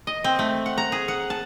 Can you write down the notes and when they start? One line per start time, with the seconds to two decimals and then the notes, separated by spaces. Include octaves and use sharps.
0.07 D#5
0.24 C4
0.39 A3
0.66 F#5
0.78 A#5
0.92 G#4
1.08 F#5
1.30 A5